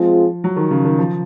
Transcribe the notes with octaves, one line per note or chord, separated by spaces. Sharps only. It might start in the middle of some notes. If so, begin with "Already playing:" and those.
Already playing: F3 G#3 C4 F4 G#4
F#3
D#3
C#3
D#3
F3